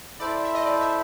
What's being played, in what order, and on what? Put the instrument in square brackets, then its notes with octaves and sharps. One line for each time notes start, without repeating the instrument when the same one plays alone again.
[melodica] E4 A4 C5 [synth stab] D5
[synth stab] E5
D#5
D5
E5